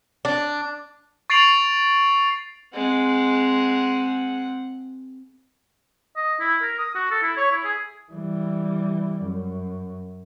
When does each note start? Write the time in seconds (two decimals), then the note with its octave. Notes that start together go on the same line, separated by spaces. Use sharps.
0.25 D4
1.30 C#6 A6 C7 D7 F7 F#7
2.74 G#3 C4 F#5
6.16 D#5
6.40 E4
6.62 A#4
6.78 D#6
6.95 F#4
7.11 A4
7.23 E4
7.37 C#5
7.51 E4
7.64 G#4
8.13 E3 G3
9.22 F#2